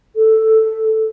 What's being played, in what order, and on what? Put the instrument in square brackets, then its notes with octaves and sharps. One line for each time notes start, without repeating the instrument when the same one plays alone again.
[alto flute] A4